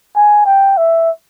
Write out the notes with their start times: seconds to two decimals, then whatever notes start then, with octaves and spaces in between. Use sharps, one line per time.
0.16 G#5
0.46 G5
0.77 E5